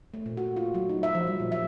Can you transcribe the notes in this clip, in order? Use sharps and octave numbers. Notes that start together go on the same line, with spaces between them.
A3
A#2
F#4
F4
F#3
D#4
E5
F3
G3
A#2
E5